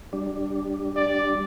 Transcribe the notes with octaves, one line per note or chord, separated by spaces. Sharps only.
G3 D4
D5